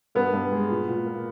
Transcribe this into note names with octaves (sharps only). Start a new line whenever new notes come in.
G2 B3
G2
G#3
A#2
A#2
A#3